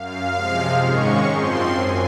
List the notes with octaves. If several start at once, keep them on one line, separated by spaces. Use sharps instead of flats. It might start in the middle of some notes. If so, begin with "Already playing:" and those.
Already playing: F#2 F5
C3 F3 G#3
G#2 D#3 G#3 C#4 C#6
F#2 F3 C4 C6
F#2 G#5